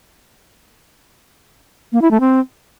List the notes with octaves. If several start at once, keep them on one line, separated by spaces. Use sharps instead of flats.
A#3
E4
A3
C4